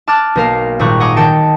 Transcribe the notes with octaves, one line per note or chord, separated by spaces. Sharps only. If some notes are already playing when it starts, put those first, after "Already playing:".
A5 D6 F6 F#6 A6
B1 A#3 A#4 F5 E7
G#1 A#2 G3 A#5 C#6 F#6
D#5 F#5 G#5 A#5 D6 D#6
D#3 G5 A5 C#7